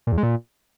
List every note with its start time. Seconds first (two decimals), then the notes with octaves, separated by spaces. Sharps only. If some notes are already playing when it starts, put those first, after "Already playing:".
0.07 A#2
0.12 E2
0.18 G#3
0.23 A#2